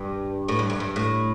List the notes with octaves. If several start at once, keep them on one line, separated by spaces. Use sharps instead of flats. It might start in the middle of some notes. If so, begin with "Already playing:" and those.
Already playing: G2
A2
G2
G2
G2
A2